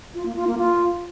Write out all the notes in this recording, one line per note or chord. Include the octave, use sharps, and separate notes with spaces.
F4
A#3
F4
A#3
F4